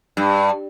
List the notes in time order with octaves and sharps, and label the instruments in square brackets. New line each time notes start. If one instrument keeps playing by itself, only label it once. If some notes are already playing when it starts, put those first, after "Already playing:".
[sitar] G2